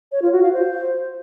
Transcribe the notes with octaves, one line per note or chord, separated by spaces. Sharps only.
C#5
F4
F#4
F5
C5